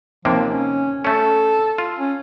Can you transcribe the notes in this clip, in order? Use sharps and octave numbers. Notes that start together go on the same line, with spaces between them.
D#2 C3 F3 A#3
C#4
A3 C#4 A4
F4
C#4